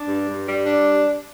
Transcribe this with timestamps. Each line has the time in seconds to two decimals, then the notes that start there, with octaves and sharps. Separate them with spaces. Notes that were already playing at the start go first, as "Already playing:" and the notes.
Already playing: D4
0.08 G2
0.28 G2
0.47 G3
0.66 D4